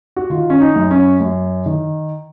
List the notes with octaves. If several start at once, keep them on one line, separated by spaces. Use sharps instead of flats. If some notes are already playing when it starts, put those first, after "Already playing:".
F#4
D#3 F4
C#4
D#4
F#2
C#4
F#2
D#3